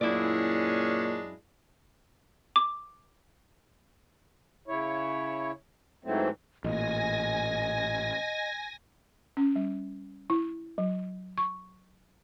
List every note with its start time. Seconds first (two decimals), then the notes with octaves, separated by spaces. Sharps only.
0.01 F#2 A#2 G#3 C#4 D4 E4 D5
2.56 D6
4.68 C#3 E4 C#5
6.04 G#2 E3 F#3 A3 C4
6.64 A1 A#2 D#5 G#5 A#6
9.37 C#4
9.56 G3
10.30 E4
10.78 F#3
11.38 C#6